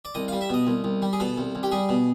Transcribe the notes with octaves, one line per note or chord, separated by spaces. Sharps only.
D5
C2 D#5
F5
G3
E5
B2 D#5
C2
C2
G3
G#4
B2 A4
C2
C2
G4
G3 G#4
B2